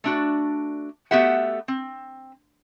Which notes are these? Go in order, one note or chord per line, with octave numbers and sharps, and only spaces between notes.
A3 D4 F#4
A3 B3 F#4 G4 E5 F#5
C4